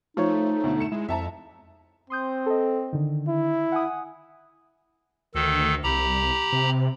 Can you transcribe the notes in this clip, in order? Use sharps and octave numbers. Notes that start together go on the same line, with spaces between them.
F3 A3 D#4 F4 C5 C#5
D2 B2
C#7 E7
G#3 E4
F2 E5 A5 A#5
C4 C6 D#6 G6
A4 D#5
D3 D#3
E4
F#5 G#5 D#6
D2 D#3 A4
C2 G4 A#5 B5
C3